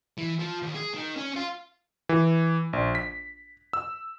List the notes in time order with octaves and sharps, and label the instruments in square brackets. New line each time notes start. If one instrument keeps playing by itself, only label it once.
[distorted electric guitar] E3
F3
D#2
G#4
D#3
C#4
F4
[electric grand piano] E3
A#1
B6
E6